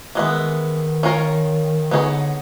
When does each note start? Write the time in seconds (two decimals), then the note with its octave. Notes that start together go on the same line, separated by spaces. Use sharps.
0.15 D#3 E3 G#3 B3
1.03 C#4 F4 A#4 C#5
1.91 D3 B3 D#4 G#4 C#5